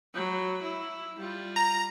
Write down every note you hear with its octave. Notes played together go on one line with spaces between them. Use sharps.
F#3 B5
E4
G3 F4
A#5